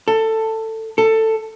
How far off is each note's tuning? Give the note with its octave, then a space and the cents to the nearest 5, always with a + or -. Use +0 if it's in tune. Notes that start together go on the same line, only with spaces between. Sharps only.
A4 +15
A4 +15